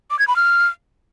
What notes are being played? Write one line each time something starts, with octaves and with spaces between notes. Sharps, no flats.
D6
G#6
B5
F6